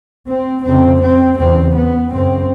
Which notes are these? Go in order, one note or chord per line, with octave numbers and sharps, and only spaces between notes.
C4
F2 C#3 C4
C4
E2 C#3 C4
B3
F#2 C#3 C4